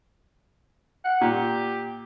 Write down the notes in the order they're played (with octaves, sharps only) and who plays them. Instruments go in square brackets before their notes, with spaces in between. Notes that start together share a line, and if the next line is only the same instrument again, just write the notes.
[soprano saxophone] F#5
[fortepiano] A#2 [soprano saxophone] G4